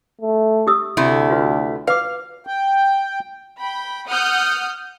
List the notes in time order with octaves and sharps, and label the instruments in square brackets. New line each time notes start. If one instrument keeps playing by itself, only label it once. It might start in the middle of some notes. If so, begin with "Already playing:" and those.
[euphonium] A3
[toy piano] G4 D#6 E6
[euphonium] D2 [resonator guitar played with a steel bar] C3 A3 E4
[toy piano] F4 F#4 B4
[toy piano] B4 D6 [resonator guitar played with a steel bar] F5
[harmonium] G5
[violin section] G5 B5
F#5 D#6 F6 G6